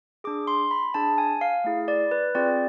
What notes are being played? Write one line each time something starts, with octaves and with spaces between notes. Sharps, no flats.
D4 G#4 D6
C6
B5
D4 G#4 A5
G#5
F5
A3 E4 G#4
D5
B4
C4 F4 G#4 D5